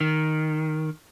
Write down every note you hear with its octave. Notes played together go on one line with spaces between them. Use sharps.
D#3